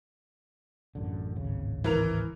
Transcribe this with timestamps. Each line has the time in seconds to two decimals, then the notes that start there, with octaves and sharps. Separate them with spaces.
0.95 A1 F#2 D3
1.36 D1 G#1 C#3
1.84 E3 A#4 F7